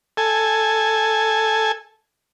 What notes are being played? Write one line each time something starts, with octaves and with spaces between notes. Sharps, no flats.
A4 G#5